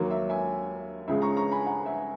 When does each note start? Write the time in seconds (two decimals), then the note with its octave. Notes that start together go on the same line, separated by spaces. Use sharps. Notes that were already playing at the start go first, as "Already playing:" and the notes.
Already playing: D#2 D#3 F#3 A#3
0.10 E5
0.29 E5 G#5
1.08 C#2 C#3 G#3 E5
1.22 A#5 C#6
1.37 A#5 C#6
1.51 G#5 B5
1.67 F#5 A#5
1.86 E5 G#5